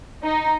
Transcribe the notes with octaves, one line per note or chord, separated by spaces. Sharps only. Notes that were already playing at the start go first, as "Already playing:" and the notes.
D#4